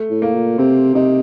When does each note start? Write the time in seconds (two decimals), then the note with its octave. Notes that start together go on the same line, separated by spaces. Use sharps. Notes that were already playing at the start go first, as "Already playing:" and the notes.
Already playing: A3
0.10 A2
0.22 A#3
0.34 A#2
0.58 C3 C4
0.95 C3 D#4